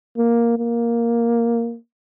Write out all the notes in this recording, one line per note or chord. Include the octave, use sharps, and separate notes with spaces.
A#3
A#3